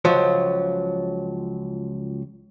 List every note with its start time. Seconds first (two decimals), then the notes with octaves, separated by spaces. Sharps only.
0.05 C#2 F3 F#3